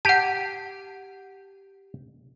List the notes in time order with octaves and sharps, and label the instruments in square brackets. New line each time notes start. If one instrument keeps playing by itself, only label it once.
[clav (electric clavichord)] G4 [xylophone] F#5 A5